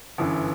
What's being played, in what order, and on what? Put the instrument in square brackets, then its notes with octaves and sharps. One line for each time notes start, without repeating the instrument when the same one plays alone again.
[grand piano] G1 F#2 E3